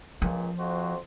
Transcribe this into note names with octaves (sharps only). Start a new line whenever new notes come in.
C#2 A#2 F3
F2 F#4 C5